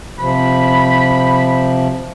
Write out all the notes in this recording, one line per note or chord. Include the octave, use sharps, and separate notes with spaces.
C3 F3 B5